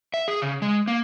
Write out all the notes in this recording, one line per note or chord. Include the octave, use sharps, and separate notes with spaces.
E5
G#4
C#3
G#3
A#3